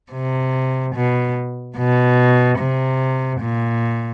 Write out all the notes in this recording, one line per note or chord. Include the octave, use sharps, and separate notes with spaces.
C3
B2
B2
C3
A#2